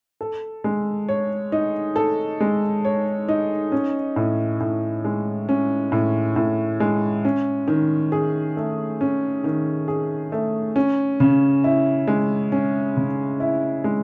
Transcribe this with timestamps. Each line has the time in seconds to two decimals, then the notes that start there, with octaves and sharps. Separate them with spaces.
0.21 A4
0.64 G#3
1.09 C#5
1.52 D#4
1.96 A4
2.40 G#3
2.85 C#5
3.29 D#4
3.72 C#4
4.16 A2
4.60 A2
5.05 G#3
5.49 C#4
5.92 A2
6.36 A2
6.80 G#3
7.25 C#4
7.68 D#3
8.12 G#4
8.57 A3
9.01 C#4
9.44 D#3
9.88 G#4
10.32 A3
10.76 C#4
11.20 C#3
11.64 E4
12.07 G#3
12.52 C#4
12.97 C#3
13.40 E4
13.84 G#3